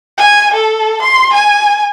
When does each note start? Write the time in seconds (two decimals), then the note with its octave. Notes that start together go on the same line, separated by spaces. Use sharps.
0.18 G#5
0.54 A4
1.02 C6
1.33 G#5